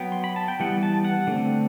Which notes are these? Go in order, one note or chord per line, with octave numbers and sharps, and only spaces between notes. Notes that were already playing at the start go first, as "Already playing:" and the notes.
Already playing: F#3 B3 G5
C6
B5
A5
G5
E3 G3 B3 F#5
A5
F#5
D3 A3 C4